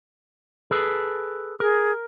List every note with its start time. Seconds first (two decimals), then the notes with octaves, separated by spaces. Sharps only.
0.71 G#4 A4 B4
1.60 G#4 A#4